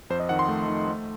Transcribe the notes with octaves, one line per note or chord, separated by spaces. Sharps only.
F2 C5
D#5
D#3 F#5
C6
A3
D#3
A3